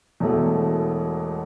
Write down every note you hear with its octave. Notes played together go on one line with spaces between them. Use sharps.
E1 E2 B2 A3